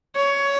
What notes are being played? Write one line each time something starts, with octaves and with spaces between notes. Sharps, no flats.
C#5